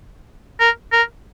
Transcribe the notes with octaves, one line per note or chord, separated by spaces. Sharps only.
A#4
A#4